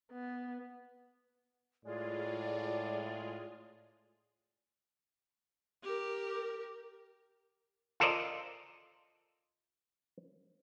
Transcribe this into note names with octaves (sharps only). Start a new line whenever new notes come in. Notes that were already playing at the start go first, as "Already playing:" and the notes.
B3
A2 G#3 F4 G#4 D5
G4 A#4
F4 A4 A#4 C5 D5 D#5